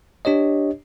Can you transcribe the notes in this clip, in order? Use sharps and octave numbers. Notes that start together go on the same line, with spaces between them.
D4 G4 C#5 D#5